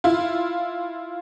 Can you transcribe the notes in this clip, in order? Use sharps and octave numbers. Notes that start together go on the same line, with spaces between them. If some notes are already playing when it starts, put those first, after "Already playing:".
E4 F4